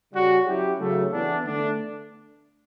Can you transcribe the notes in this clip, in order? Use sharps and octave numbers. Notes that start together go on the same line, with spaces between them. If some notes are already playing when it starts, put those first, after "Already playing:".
C#3 G3 C#4 F#4
F#3 C#4 E4 G4
C#3 F#3 A3
E3 B3 D4
D3 A3 D4